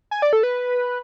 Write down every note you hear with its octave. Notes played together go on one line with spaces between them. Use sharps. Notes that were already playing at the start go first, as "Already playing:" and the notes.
G#5
D5
A4
B4